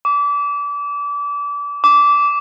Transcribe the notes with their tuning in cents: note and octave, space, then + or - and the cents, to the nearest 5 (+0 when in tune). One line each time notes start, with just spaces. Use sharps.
D6 -30
D6 -20